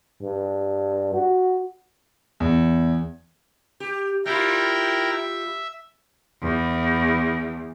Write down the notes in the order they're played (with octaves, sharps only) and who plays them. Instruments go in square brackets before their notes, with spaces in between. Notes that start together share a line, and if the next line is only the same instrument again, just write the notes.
[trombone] G2
F#4
[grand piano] E2
[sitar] G4
[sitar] G3 F4 [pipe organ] E4 A#4 G5
[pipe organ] E5
[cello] E2